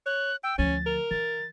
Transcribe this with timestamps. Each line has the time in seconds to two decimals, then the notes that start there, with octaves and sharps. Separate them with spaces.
0.06 C#5 F#6
0.44 G5 E6
0.58 D2 F3 C#4 A6
0.86 A#4
1.11 E3 A6